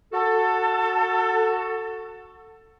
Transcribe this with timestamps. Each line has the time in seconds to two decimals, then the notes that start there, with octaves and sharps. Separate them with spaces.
0.12 F#4 A4